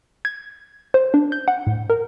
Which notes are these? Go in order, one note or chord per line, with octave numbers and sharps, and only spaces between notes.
G#6
C5
D4
G6
F#5
A2
A#4